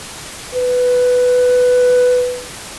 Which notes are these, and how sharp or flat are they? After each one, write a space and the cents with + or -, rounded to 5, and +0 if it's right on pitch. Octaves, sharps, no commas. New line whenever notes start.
B4 +5